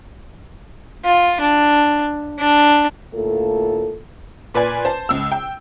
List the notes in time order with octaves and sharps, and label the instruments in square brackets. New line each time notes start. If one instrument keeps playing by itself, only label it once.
[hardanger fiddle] F4
D4
D4
[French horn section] D2 A2 A#3 F4 A4
[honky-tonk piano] A#2 B4 D5 G#5
C5 A5
C#2 E6
G5